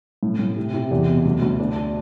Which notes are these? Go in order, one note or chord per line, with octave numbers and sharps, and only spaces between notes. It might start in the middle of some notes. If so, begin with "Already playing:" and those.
A2
A2
C3
C3
E2
B2
D2
D2
D4
D4